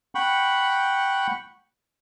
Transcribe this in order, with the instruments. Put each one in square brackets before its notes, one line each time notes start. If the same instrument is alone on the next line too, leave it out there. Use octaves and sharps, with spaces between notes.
[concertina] F#5 G5 B5 C#6